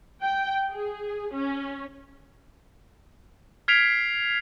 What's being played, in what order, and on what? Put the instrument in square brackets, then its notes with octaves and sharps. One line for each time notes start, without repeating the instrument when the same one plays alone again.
[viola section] G5
G#4
C#4
[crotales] F6 G#6 B6 C7 D7 F7